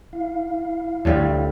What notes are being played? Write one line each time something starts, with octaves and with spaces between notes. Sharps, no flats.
E4 F5
D2 A2 G3 C4